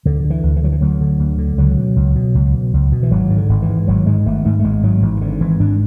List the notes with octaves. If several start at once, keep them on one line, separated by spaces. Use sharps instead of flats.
D2 D3
D3
E3
D2
E3
D3 F#3
E3
D2 F#3
D3
D2
D3
C#2 F#3
B2
C#2
B2
C#2
B2
C#2
B2
E3
G#1 F#3
G#2
D3
G#1
E3
G#2
G#1 F#3
G#2 G#3
G#1 A3
G#2 A3
A3
G#1 G#3
G#2 F#3
G#1 E3
E3
G#2 D3
G#1 E3
G#2 D4